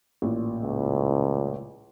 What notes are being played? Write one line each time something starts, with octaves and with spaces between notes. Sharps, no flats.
A1 A#2
C#2